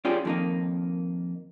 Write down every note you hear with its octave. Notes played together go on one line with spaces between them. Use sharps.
C#4 F4 G4 G#4 D5
F2 D#3 G3 A#3 D#4